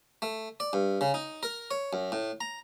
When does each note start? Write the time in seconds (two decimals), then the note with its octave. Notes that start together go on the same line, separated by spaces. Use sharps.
0.22 A3
0.60 D5
0.73 G2
1.01 C#3
1.14 D#4
1.43 A#4
1.71 C#5
1.93 F#2
2.12 A2
2.41 A#5